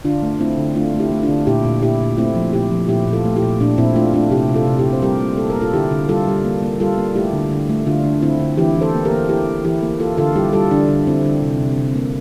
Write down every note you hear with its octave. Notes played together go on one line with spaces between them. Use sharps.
D3 D4 F4
A3
A3 C4 E4
D3
A3 D4 F4
A3
E4 G4
A3
D4 F4
D3
A#2 E4 G4
A#2
A#2 E4 G4
A#2
A3 C4 E4
F3
A#2 E4 G4
F3
A#2 E4 G4
A#2
F4 A4
A3
E4 G4
A#2
A#2 D4
A#2 C4 E4
A3 D4 F4
A3 D4 F4
C3 E4 G4
C3
F4 A4
C3
E4 G4
C3
C5
G3 G4 A#4
A#3
A#3 A4
A#4
A#3
F4 A4
D3 E4 G4
D3
G3 F4 A4
G3
A#3
A#3
G3 F4 A4
A#3
A3 E4 G4
D3
D3
A3
D3 D4 F4
D3
D3 C4 E4
D3
E3 E4 G4
E3
A4 C5
A#3
G4 A#4
A#3
A#3 E4 G4
A#3
E3 E4 G4
A#3
A#3 F4 A4
D3 F4 A4
G3 E4 G4
G3 F4 A4
D3 D4
D3
D3 C4 E4
D3
C3
C3
C3
A#3